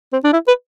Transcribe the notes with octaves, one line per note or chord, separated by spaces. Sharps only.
C4
D4
E4
B4